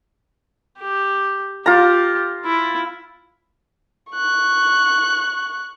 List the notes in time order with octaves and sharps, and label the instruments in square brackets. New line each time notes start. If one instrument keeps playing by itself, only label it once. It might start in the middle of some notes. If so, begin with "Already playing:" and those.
[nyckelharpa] G4
[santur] F4 A#5 [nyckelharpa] G4
[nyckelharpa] E4
[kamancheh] C#6 F#6